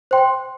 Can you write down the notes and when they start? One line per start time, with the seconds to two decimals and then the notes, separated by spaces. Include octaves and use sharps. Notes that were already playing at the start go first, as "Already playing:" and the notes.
0.11 C5 G5 C6